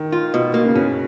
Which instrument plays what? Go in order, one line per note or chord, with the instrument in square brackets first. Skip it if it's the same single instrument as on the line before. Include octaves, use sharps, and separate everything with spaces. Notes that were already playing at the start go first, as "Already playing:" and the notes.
Already playing: [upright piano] D#3
[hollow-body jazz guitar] F4
B2
A#3
[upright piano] C#3
[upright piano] B2 [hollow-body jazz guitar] C#4